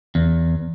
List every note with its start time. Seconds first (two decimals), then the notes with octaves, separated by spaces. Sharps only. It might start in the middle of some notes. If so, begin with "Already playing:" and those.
0.15 E2